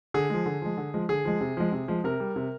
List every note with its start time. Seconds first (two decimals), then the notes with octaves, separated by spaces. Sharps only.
0.14 D3 G#4
0.30 F3 G#3
0.46 D3
0.62 F3 G#3
0.77 D3
0.94 F3 G#3
1.09 D3 G#4
1.25 F3 G#3
1.41 C3
1.57 F3 G#3
1.72 C3
1.88 F3 G#3
2.04 C3 A#4
2.20 G3
2.36 C3